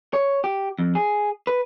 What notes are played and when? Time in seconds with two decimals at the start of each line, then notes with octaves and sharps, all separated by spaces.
0.13 C#5
0.44 G4
0.79 F2
0.95 G#4
1.47 B4